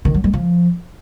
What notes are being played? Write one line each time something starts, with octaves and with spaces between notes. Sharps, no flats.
D#3
F#3
G3
F3